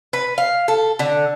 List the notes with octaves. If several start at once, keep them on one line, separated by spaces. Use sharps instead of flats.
B4
F5
A4
D3